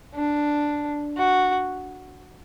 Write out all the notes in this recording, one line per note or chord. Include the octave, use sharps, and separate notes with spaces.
D4
F#4